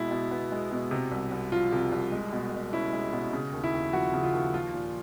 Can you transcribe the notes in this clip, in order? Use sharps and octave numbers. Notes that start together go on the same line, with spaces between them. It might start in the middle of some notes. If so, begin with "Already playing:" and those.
Already playing: B2 G#3 E4
B2
B3
G#3
B2
C3
C2
C2
F3 F4
C3
C2
G#3
B2
B2
C#4 E4
G#3
B2
C#3
D#2
E4
D#2
F3 F#4
C#3
F4
D#2
F3 F4
A#2